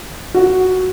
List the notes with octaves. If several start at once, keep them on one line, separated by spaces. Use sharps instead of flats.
F#4